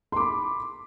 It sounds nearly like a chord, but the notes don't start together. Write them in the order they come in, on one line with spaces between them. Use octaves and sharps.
C6 D6 B5